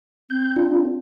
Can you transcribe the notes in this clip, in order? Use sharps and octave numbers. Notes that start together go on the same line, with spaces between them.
C4 G6
D4 F4